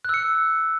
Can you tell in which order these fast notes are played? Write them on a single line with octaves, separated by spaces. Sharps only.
F#6 E6 C#7